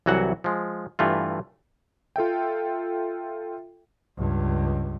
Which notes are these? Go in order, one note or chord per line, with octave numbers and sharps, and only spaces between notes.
C2 E3 F#3 F#4 F#5
F3 G#3
G2 E3 A3 F4
F4 A4 E5 G5
C#2 G2